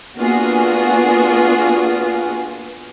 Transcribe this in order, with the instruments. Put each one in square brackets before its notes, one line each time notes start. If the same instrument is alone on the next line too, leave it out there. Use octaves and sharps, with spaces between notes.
[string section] A#3 B3 D4 F4 F#4 G#4